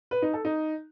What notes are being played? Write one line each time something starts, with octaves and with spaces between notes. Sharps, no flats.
B4
D#4
A4
D#4